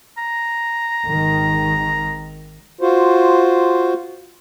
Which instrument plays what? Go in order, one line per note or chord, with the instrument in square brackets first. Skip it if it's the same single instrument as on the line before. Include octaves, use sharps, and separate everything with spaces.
[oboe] A#5
[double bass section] G#1 D#3
[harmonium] F4 F#4 C5